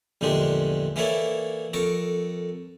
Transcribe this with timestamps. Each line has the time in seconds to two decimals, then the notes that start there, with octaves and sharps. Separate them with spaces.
0.21 A#1 E2 D3 G#3 D4 G4
0.96 E3 A#3 E4 A4 C#5 D5
1.73 F2 A4 A#4 C#6 D6